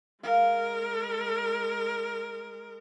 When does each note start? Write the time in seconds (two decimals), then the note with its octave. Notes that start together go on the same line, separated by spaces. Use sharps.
0.23 G#3 A#4 F5